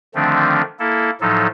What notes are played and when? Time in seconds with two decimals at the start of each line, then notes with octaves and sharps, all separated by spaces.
0.15 D3 D#3 F3 A3 C4 D4
0.80 A#3 E4 A4
1.21 A2 F3 F#3 D#4 A4